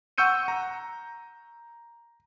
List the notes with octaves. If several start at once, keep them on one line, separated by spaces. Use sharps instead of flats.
F#5 C#6 E6 G6 C#7 D#7
A#5